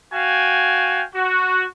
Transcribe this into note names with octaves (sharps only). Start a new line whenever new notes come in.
F#4 F5 G5 G#5
F#4